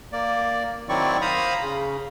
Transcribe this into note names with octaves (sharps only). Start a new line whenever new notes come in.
A#3 D5
D#3 F#3 C4 E4 D5 C#6
C5 F5 A#5 B5 D#6
C#3